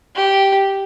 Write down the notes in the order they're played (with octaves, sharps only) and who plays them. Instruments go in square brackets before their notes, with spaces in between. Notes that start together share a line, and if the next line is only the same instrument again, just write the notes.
[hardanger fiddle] G4